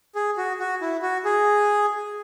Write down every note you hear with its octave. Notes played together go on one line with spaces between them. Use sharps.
G#4
F#4
F#4
E4
F#4
G#4